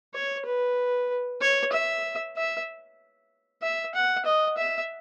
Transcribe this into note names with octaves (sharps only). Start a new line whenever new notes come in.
C#5
B4
C#5
E5
E5
E5
F#5
D#5
E5